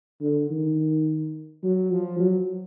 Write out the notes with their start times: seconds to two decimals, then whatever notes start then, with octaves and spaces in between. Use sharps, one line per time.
0.21 D3
0.50 D#3
1.63 F#3
1.91 F3
2.19 F#3